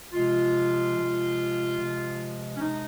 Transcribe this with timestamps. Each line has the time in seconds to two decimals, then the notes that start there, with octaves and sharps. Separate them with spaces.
0.13 C3 F3 G#3 F4
0.95 C3 F3 G#3
1.78 C3 F3 G#3
2.56 C#4
2.60 C3 F3 G#3 D#4